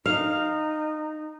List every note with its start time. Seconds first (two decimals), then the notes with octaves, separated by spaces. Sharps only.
0.06 D#4 F5